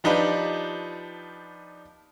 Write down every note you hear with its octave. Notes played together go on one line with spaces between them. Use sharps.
F3 D4 D#4 F4 G4 B4